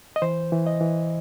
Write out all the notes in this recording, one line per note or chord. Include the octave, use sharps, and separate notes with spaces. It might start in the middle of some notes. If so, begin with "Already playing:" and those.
D#5
E3 C5
E3
D#5
E3